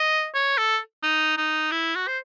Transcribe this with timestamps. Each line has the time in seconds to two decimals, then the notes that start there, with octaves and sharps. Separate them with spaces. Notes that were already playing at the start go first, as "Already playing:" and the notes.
Already playing: D#5
0.34 C#5
0.58 A4
1.03 D#4
1.37 D#4
1.72 E4
1.96 F#4
2.08 C5